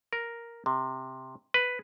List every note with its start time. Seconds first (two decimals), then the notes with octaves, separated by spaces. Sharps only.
0.13 A#4
0.66 C3
1.54 B4